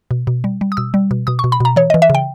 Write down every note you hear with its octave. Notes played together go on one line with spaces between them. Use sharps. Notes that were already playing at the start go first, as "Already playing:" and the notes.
B2
B2
G3
G3
D#6
B2 E6
G3
B2
B2 D#6
C#6
B2
B5
B2 A#5
E3 C#5
D#5
E3
E5
C#3 G5